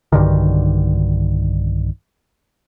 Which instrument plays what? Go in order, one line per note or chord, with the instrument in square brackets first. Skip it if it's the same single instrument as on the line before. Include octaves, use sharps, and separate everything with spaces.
[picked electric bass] B1 G2 D3 D#3